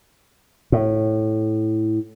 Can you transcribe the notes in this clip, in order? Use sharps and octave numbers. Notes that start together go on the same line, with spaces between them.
A2